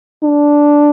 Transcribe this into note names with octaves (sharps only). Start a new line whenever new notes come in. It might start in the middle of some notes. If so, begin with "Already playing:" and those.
D4